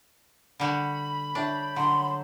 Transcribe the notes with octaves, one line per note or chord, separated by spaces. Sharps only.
D3 G3 F#4 B5
D4 C#5 E5 G5
D3 F#3 G4 C6